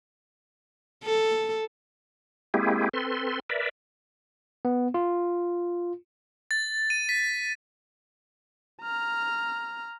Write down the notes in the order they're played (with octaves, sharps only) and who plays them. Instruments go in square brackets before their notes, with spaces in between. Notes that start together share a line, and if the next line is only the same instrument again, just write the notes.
[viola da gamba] A4
[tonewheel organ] G#3 A#3 C4 E4 G4 G#4
C4 A4 B4 C6
A#4 B4 D5 E5
[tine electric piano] B3
F4
[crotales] A6
D#7
B6
[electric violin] A#5 F6